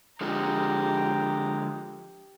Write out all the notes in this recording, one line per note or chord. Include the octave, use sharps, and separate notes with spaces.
D3 F3 G#3 G4 A#5